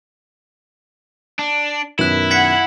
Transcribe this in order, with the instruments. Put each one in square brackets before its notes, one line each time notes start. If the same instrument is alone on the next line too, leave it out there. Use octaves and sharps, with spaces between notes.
[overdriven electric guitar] D4
[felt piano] F#2 B2 D#3 [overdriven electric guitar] E4 [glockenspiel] F#6 E7
[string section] F#5 [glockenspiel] G#6 B6 C#7